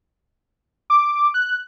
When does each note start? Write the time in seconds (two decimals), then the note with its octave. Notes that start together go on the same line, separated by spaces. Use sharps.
0.90 D6
1.34 F#6